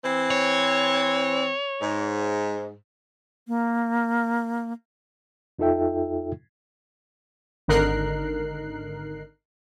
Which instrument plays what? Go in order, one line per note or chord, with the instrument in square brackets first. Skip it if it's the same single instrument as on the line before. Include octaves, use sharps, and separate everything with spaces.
[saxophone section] E3 C4
[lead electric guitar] C#5
[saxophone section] G#2
[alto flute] A#3
[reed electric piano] F2 D#4 F4 A4 E5 G5
[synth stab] G#1 D3 D#4 A#4 F#6 C7